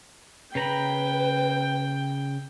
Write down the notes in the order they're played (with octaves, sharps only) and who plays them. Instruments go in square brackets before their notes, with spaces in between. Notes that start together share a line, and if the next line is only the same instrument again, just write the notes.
[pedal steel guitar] C#3 A#5 B5 [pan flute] B4 [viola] G5